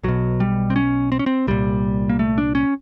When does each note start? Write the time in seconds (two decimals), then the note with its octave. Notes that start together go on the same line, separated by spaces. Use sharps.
0.04 B1 B2 F#3
0.40 G3
0.70 C4
0.76 C#4
1.12 C4
1.19 C#4
1.26 C4
1.47 C2 A#2 G3
2.09 A#3
2.19 A3
2.38 D4
2.55 C#4